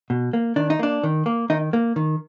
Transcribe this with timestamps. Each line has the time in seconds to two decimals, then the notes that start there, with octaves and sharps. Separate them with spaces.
0.10 B2
0.33 A#3
0.56 D#3 D4
0.70 D#4
0.79 A#3 D4
1.04 D#3
1.26 A#3
1.50 D#3 D#4
1.73 A#3
1.96 D#3